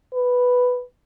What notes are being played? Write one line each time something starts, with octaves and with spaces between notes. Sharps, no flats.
B4